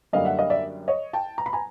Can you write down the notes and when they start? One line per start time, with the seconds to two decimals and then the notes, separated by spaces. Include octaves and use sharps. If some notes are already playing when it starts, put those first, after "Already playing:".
0.13 F#2 D3 G3 A#3 D#5 F5
0.25 E5 F#5
0.39 D#5 F5
0.50 D5 E5
0.88 C#5 D#5
1.13 G5 A5
1.38 A#5
1.46 B5
1.53 G#5 A#5